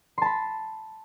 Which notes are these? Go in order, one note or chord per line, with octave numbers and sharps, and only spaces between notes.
A5 B5 C6